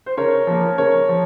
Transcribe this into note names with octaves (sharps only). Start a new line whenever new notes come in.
C5
C#3 A#4 C#5
F3 A#3
C#3 A#4 C#5
F3